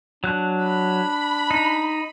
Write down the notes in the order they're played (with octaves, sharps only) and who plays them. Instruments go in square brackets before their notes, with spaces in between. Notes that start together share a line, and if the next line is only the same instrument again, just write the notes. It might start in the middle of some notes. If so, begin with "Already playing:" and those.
[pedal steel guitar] F#3 F#6 [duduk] D4
[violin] B5
[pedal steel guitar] D#4